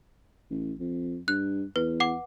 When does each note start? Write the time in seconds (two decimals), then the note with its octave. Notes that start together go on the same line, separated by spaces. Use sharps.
0.51 A1
0.80 F2
1.28 G2 F#6
1.76 E2 B4
2.00 F#5 D6